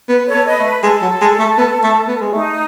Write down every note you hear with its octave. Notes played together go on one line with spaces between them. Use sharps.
B3 B4
A4 C#5
B3
B4 D#5
A3
B4
G#3 A4
F#3
G#3
A3
B3
A3
B3
G#3
A3 D#4